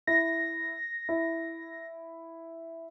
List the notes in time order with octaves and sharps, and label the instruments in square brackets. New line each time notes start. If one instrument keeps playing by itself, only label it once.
[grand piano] E4 [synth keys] A#6
[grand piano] E4